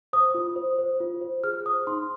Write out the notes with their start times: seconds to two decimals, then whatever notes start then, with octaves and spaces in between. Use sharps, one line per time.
0.13 C5 D#6
0.35 F4
0.56 C5
0.79 C5
1.00 F4
1.21 C5
1.44 G#4 F6
1.65 C5 D#6
1.87 D#4 C6